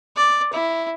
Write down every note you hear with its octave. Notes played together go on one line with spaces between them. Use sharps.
D5
E4